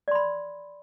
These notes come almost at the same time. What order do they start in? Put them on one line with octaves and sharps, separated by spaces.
D5 C6 B5